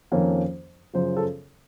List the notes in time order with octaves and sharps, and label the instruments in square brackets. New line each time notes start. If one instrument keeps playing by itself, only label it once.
[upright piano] F2 D#3 A#3 C#4
F#2 C#3 F3 C5
A4